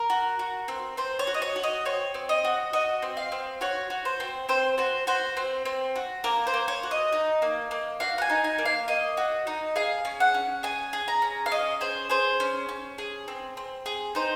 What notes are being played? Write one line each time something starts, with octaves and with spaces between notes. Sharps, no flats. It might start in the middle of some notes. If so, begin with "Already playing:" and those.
Already playing: A#4
F#4
F#4
C4
C4 C5
C#5
F#4
D#5
C#5
F#4
D#5
C4 C#5
C4
D#5
F#4
F#4 D#5
C4
F5
C4
F#4 C#5
F#4
C5
C4
C4 C5
F#4 C5
F#4 C5
C4
C4
F#4
A#3 A#4
C5
A#3
C#5
F#4
D#5
D#4
A#3
A#3
F#4 F5
F#5
G#5
D#4
G#5
A#3
F5
A#3 D#5
F#4
D#4
G#4 F5
C#4
F#5
C#4
G#4 G#5
G#4
A#5
C#4
F5
C#4 D#5
G#4 C5
G#4 C5
C#4
C#4
G#4
C4
C4
G#4
D#4 C5